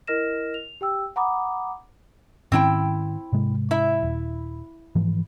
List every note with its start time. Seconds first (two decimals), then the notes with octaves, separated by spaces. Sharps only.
0.07 E4 A#4 D#5 F6 A#6 E7
0.54 F7
0.81 G4 G5 E6
1.16 F#5 A#5 B5 D6 D#6
2.52 G#2 D#3 C4 C#4 E4 G5
3.33 G#2 C3 G#3
3.71 E4 E5
4.03 D#1
4.95 G#2 E3 F3